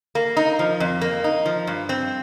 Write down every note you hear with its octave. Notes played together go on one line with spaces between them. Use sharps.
A#3
D#4
F3
F2
A#3
D#4
F3
G2
C4